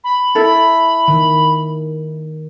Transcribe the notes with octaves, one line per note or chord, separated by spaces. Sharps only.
B5
E4 A4
D#3